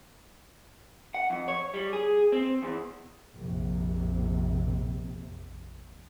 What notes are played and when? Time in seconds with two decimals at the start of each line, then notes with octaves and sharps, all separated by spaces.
1.14 F#5
1.30 F2
1.48 C#5
1.74 G3
1.93 G#4
2.32 C4
2.63 E2
3.34 A#1 F2 C3